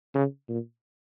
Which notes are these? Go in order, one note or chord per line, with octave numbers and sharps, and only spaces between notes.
C#3
A#2